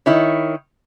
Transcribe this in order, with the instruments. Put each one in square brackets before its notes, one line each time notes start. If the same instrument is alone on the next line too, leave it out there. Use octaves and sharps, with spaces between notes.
[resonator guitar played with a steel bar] D#3 E4 C#5